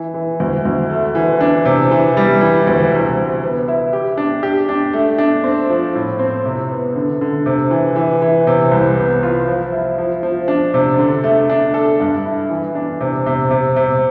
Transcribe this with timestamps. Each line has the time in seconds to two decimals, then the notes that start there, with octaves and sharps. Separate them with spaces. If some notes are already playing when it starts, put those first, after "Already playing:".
Already playing: E3
0.14 E3
0.40 D2
0.65 D2
0.90 A3
1.15 E3
1.41 D4
1.65 C3
1.91 E3
2.17 G3
2.41 E3
2.67 D2
2.93 C3
3.17 C3
3.43 B3
3.68 E4
3.93 G4
4.18 D4
4.43 G4
4.69 D4
4.93 A3
5.18 D4
5.44 C4
5.70 F3
5.95 A2
6.19 C4
6.46 C3
6.71 B3
6.96 D3
7.21 D3
7.46 C3
7.71 E3
7.96 E3
8.22 E3
8.47 C3
8.71 C2
8.97 B3
9.23 F4
9.47 F3
9.72 E4
9.98 F3
10.23 F3
10.48 D4
10.74 C3
10.98 D3
11.24 A3
11.49 D4
11.74 A4
12.00 G2
12.25 E4
12.50 E3
12.75 D4
13.01 C3
13.26 C3
13.51 C3
13.76 C3